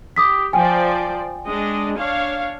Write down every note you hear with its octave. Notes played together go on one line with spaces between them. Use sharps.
G4 D6 D#6 B6
F3 C5 D5 G5 G#5
G#3 D4 D#5
D4 C#5 F5